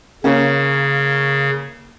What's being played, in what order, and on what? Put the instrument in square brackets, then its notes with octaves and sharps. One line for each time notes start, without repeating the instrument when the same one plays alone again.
[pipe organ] C#3 [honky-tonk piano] A#3 C#4